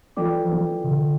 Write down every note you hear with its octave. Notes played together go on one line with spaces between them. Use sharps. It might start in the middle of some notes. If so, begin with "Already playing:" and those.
E3 F4 A4 D5 G5 D6
F3
E3
C3
D3